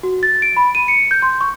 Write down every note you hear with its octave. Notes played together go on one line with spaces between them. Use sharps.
F#4
A6
D7
B5
D#7
C#7
G6
C6
C#6